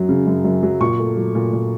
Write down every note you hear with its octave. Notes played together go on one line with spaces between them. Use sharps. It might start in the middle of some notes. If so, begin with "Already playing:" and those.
Already playing: F#2 F#3
C#3
F#2
F#2
F#3
A#2 C#6
A3
F#3
A#2
A#2